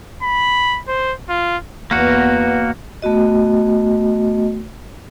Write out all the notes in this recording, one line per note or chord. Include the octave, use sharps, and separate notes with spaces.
B5
C5
F4
E2 A#3 B3 F#4
A3 B3 F#4 D#5